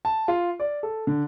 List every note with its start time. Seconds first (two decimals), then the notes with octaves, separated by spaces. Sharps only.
0.05 A5
0.28 F4
0.60 D5
0.83 A4
1.07 D3